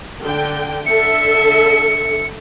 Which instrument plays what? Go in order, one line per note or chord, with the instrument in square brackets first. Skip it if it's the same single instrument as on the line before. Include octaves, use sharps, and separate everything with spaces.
[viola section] D3 G5
[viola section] D3 A4 E5 [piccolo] C#7